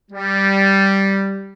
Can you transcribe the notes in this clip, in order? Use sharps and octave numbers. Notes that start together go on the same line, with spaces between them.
G3